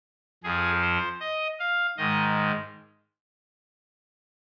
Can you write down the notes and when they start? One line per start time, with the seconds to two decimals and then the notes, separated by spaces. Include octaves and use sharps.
0.44 F2 F3 G#4
0.82 C5
1.21 D#5
1.60 F5
1.98 G#2 D#3 D#5